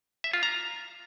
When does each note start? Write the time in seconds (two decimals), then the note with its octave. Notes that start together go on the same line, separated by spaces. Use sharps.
0.24 E5
0.33 F4
0.43 A#5